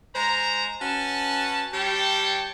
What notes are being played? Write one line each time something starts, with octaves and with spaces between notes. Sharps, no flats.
G#3 C5 A#5
C#4 F#4 B4 A5
G3 G4 C#5 G5 A5